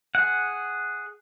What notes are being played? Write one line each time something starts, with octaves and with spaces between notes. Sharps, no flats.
G#4 F#5